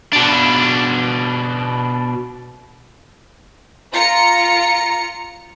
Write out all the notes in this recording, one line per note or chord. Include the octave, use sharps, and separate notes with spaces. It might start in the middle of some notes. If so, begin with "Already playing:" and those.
B2 D4
F4 A#5 C#7